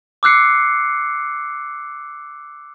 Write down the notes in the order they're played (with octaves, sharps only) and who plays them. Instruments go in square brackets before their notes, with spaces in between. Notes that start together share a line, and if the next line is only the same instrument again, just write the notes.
[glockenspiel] D6 E6 F#6 C7 C#7